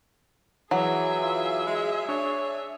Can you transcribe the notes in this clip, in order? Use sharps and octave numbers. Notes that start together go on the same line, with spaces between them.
E3 F#3 G#4 E5
F4
G#3
D4 C#5